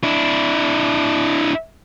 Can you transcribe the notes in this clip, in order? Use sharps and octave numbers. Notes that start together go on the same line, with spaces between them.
D4 E4